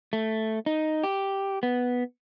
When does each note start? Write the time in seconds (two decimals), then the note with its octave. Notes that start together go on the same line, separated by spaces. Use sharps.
0.13 A3
0.66 D#4
1.03 G4
1.63 B3